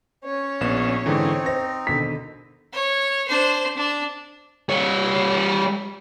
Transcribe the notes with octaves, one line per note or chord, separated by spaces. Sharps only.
C#4 C#5
A#1 B3 E7
G#2 D3 E3 C4 D#4
C5 A#6
B2 D3 D#3 B6
C#5
D4 C5
D4
G3 C#5